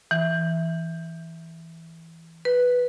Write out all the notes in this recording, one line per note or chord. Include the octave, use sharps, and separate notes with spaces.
E3
B4